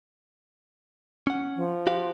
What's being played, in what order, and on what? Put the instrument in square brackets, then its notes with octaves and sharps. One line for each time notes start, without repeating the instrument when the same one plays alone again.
[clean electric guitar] C#4 F#5
[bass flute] F3
[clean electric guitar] F#4 G4 F5